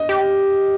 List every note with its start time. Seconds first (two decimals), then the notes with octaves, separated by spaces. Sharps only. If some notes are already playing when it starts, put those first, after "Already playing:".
Already playing: D#5
0.09 G4